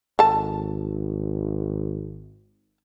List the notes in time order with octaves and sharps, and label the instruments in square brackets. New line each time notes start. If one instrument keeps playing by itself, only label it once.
[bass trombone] G#1 [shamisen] A4 A5